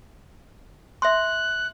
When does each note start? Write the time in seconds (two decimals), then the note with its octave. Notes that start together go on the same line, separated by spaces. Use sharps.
1.02 E5 C6 F#6